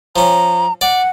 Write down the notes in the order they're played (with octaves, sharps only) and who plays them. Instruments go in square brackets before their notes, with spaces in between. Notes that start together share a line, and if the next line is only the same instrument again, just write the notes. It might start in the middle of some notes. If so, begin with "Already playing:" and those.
[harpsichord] F3 C#4 [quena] A#5
[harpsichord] D5 [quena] F#5